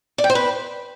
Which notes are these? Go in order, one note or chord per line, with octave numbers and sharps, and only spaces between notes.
D5
G5
C5
B4